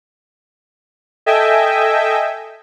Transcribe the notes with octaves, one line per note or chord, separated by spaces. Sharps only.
A4 D#5 E5 G5 G#5